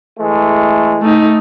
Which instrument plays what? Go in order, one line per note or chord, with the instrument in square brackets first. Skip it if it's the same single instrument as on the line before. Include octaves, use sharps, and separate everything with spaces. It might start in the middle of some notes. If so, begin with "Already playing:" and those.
[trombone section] E3 G#3 A3
[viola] A3 D#4